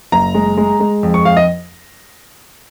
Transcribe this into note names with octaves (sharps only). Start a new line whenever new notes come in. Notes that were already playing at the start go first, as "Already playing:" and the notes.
F#1 A#5
G#3
G#3
G#3
F2
C#6
F2 F5
D#5